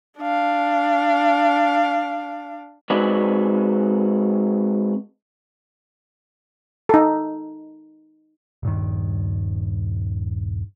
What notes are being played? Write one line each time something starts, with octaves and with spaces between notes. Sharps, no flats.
D4 F5
G#3 C4 D#4 F#4 B4 D5
D#4 A4
D#1 G2 D#3